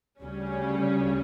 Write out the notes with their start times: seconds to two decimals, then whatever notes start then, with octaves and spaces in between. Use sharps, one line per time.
0.22 D2 C#3 G3 C#4